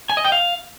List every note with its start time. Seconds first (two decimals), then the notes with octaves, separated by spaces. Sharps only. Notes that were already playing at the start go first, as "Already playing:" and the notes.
0.10 G#5
0.17 D#5
0.24 G5
0.32 F5